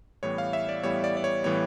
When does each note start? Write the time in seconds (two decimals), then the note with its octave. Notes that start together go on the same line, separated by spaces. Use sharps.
0.23 A2 E3 G3 B3 C#5
0.38 F5
0.53 E5
0.69 D5
0.83 A2 E3 G3 B3 C#5
1.04 D5
1.17 D5
1.24 C#5
1.44 A2 E3 G3 B3 C#5